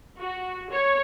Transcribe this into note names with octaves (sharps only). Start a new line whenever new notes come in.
F#4
C#5